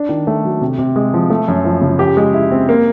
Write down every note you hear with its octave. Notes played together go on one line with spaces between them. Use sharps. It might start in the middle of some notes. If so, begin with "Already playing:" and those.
Already playing: D4
D#3
A3
F#3
C3
C3
G#3
F3
A3
F#2
F3
C#3
G4
G#3
E4
C4
A#3